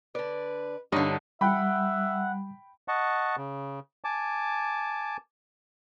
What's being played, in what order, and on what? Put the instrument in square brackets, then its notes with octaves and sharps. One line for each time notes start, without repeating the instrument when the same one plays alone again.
[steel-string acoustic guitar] D3 D5 [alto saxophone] B4
[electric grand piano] G2 [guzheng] D3 D#4 [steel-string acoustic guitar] C#4 [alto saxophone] G4
[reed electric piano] G3 [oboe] E5 [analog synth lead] F#5 [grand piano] G5 B5
[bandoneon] D#5 F#5 A5 C#6
C#3
G#5 A5 D6